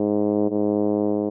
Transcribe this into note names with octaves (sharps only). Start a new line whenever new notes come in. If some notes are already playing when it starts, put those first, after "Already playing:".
Already playing: G#2
G#2